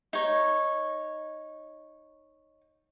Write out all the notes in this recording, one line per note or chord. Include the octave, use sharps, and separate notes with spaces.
D#4 C#5